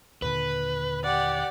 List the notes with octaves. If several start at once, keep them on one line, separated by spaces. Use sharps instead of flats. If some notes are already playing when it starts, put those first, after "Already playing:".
D#2 A#2 D3 B4
G4 D5 F#5